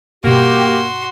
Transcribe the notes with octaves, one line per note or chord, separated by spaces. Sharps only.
G2 B2 A#3 F#4 G4 C6